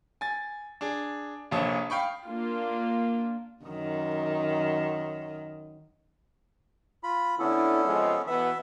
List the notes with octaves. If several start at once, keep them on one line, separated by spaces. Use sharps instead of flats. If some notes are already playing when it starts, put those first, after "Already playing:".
G#5 A6
D4 G#4
F1 A#1 A#3 C#5 A5 D#6
F5 G5 B5 C#6
A#3 D4 F4
F#2 D#3
F4 B5
D3 B3 C#4 E4 A4
C3 F3 G#3
B2 E3 B3 E5